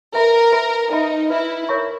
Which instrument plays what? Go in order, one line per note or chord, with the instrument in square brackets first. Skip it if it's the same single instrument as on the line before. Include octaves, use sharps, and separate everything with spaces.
[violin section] A#4 [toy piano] B4 E5 B5
[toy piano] B4 E5 B5
[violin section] D#4 [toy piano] B4 E5 B5
[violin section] E4 [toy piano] B4 E5 B5
[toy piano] A#4 C#5 E5 A#5 C#6